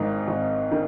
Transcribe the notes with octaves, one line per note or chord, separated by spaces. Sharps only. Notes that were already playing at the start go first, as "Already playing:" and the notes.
Already playing: G#1 G#2 D#3 D#4
G#1
D#3